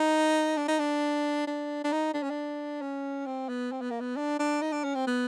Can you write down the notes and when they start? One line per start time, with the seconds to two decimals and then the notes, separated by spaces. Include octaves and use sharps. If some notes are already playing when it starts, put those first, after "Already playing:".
Already playing: D#4
0.57 D4
0.68 D#4
0.79 D4
1.47 D4
1.84 D4
1.92 D#4
2.14 D4
2.23 C#4
2.30 D4
2.81 C#4
3.26 C4
3.49 B3
3.72 C4
3.81 B3
3.91 A#3
4.00 B3
4.16 D4
4.39 D4
4.61 D#4
4.72 D4
4.84 C#4
4.95 C4
5.07 B3